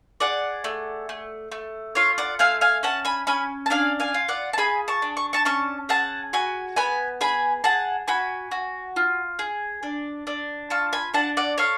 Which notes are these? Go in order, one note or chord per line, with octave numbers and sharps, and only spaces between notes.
G#4 D5 F#5
A3
A3
A3
F4 C#5 F5
D5 F#5
A3 F5 G#5
F5 G#5
C#4 F#5 A5
G#5 B5
C#4 G#5 B5
A5
D4 F5 G#5
F5 G#5
F4
D5 F#5
A5
G#4 G#5 B5
A5 C#6
D4
C#6
A5 C#6
C#4 A5 C#6
G#4 F#5 A5
F#4 G#5 B5
B3 G#5 B5
G#4 G#5 B5
G#4 F#5 A5
F#4 G#5 B5
F#4
F4
G#4
D4
D4
F4 A5 C#6
G#5 B5
D4 F#5 A5
D5 F#5
A4 C#5 F5